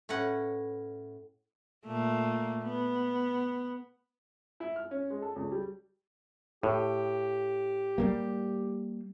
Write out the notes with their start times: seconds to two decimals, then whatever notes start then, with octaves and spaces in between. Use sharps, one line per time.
0.09 A2 C#4 B4 F#5
1.86 A#2 A3 A#3
2.64 B3
4.60 E4
4.76 F6
4.91 C#4
5.10 G#3
5.22 A4
5.36 C#2
5.52 G3
6.63 A2 G4
7.98 G3 A3 A#3